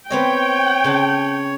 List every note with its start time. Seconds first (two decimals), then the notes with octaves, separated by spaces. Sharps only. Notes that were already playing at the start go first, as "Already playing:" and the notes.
0.10 B3 C4 C#5 D#5 G5
0.84 C#3 A5 C6